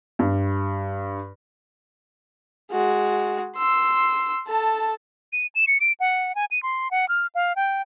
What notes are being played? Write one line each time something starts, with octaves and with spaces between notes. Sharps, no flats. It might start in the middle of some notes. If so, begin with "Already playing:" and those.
G2
G#3 F#4
C6 E6
A4 A5
D#7
E7
C#7
D7
F#5
G#5
D#7
C6
F#5
F6
F5
G5